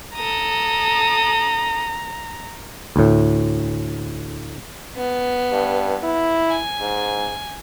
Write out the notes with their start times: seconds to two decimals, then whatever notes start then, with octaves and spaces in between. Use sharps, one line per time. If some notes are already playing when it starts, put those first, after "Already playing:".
0.16 A4 A#5 D#6
2.96 D2 A2
4.96 B3
5.52 G2
6.03 E4
6.50 G#5
6.81 G#2